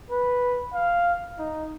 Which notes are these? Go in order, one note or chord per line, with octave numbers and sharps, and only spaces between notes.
B4
F5
D#4